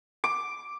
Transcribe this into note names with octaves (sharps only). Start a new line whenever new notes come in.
D6